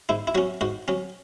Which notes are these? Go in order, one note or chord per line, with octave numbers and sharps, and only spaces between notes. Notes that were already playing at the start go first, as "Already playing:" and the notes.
G#2 E4
E4
F#3 C#4 F#4
G#2 F#4
F#3 C#4